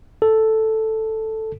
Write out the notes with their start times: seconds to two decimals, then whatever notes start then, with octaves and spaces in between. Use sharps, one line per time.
0.22 A4